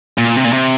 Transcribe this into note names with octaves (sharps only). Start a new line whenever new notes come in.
A#2
C3
A#2
C3